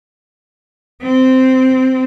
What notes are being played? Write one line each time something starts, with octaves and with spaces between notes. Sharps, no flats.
C4